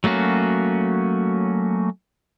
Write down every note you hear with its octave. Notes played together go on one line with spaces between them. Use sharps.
F#3 A3 A#3 C#4 F#4